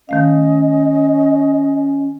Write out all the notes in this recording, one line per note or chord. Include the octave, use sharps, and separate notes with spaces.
D#3 A3 C#4 D#5 F5